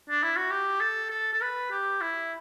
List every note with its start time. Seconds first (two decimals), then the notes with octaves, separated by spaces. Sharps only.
0.09 D4
0.23 E4
0.36 F#4
0.51 G4
0.81 A4
1.10 A4
1.33 A4
1.41 B4
1.71 G4
2.01 E4